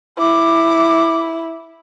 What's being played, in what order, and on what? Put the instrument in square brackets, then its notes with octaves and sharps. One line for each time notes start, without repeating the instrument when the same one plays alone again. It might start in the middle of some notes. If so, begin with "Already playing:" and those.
[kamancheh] E4 [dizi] D6